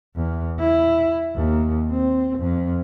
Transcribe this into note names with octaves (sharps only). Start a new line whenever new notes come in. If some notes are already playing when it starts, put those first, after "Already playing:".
E2
E4
D#2
C4
F2